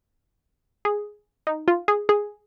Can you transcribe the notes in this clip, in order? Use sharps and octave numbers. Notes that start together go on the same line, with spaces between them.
G#4
D#4
F4
G#4
G#4